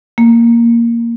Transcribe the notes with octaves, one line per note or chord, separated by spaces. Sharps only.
A#3